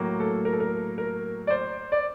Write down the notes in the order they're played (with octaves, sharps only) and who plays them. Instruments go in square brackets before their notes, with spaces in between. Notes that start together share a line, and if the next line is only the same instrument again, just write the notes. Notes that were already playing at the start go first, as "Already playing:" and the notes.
Already playing: [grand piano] A2 F#3 A#3
A4
A#4
A4
A#4
A#4
D5
C5
D5